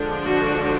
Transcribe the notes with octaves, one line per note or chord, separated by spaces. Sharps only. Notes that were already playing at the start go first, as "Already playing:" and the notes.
Already playing: D3 F3 G#3 D4
F#4